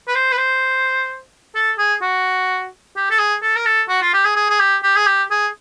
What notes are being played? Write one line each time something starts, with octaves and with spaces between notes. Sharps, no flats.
B4
C5
B4
C5
A4
G#4
F#4
G4
A4
G#4
A4
A#4
A4
F#4
F4
G4
G#4
G#4
G#4
G4
G4
G#4
G4
G#4